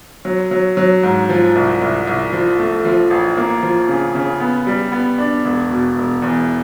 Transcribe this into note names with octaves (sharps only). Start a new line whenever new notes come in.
F#3
F#3
F#3
G#2
F3
C2
C2
C2
F3
A3
F3
A1
A#3
F3
C#3
C#3
B3
G3
B3
D4
E1
B2
E1
E2